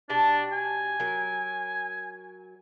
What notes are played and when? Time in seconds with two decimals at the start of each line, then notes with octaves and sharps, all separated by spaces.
0.10 B2 D4 G4 A5
0.52 G#5
1.00 F#3 A#4